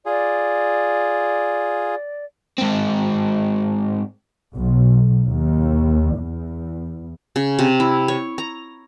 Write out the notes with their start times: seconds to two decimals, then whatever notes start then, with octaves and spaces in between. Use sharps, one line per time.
0.06 F4 G#4 D5
2.58 G#2 C4
4.54 B1
5.27 D#2
6.17 E2
7.36 C#3
7.59 C3
7.80 E4
8.08 C#5
8.38 A#5